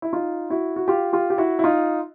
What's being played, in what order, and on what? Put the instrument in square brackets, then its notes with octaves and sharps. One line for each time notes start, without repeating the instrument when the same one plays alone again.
[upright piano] E4
D#4 F4
E4 F#4
F#4
F4 G4
F4 G4
G4
E4 F#4
E4
D#4 F4